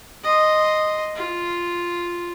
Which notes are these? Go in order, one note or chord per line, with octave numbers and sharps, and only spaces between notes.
D#5 C6
F4